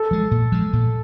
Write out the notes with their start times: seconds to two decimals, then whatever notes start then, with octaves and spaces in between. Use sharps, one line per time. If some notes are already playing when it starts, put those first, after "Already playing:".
Already playing: A4
0.11 F3 G#3
0.31 A#2
0.52 F3 G#3
0.73 A#2